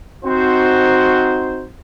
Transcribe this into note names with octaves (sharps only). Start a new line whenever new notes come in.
C4 D#4 F#4 C5